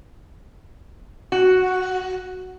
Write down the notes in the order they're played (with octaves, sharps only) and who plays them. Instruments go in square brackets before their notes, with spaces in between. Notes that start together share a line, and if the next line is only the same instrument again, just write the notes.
[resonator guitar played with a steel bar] F#4